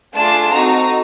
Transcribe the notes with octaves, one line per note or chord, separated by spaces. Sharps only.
A3 D4 F4 G#4 A5
C4 D#4 F#4 A4 A#5